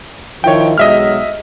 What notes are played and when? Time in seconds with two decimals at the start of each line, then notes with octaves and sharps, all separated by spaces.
0.44 D#3 F3 E4 C#5 G5
0.78 B1 F#3 G#3 D#5 E5 F6